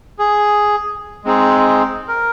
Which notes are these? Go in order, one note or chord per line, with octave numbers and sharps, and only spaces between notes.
G#4
G#3 C4 D#4 G#4
A#4